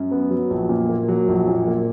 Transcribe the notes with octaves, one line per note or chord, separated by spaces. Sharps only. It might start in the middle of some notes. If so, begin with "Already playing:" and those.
Already playing: F#2
B3
F#3
A#1
A#2
A#3
F#3
A#1
A#2
A#3